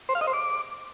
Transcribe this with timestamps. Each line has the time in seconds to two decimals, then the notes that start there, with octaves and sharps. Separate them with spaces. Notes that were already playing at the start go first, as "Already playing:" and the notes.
0.09 C5
0.15 F5
0.21 D#5
0.27 C5
0.33 D6